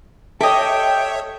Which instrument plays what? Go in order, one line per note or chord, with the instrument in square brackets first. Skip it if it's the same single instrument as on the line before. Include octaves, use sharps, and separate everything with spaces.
[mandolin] G4 D#5 [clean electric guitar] A4 [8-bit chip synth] C#5 E5 [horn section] G5